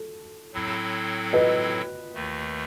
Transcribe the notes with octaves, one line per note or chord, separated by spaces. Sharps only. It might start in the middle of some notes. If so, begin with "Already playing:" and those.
Already playing: A4
A2 F#3 C4 E4 A4
B4 D#5
D#2 D#3 A3